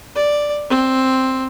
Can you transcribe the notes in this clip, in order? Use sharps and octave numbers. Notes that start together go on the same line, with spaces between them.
D5
C4